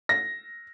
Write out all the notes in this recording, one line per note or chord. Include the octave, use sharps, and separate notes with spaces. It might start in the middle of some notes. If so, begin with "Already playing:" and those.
A#6